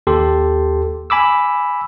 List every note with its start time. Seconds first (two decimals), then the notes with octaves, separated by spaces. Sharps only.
0.07 D#2 G4 A4 C6
1.10 G#5 B5 D6 E6